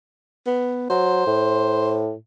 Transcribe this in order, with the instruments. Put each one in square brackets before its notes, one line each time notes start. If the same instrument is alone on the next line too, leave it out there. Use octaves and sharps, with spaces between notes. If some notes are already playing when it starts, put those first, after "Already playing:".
[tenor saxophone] B3
[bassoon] F#3 [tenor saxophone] C5
[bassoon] A2